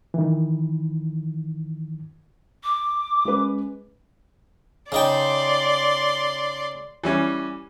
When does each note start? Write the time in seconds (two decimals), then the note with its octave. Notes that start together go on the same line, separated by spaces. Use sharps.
0.14 D#3 E3
2.64 D6
3.25 G#3 C#4 B4
4.92 C#3 D#4 D5 G5 C6
7.04 E3 G3 C#4